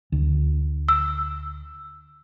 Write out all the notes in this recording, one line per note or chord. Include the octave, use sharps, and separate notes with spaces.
D2
E6